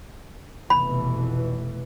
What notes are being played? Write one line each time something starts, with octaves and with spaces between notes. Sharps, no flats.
F1 B2 E3 B5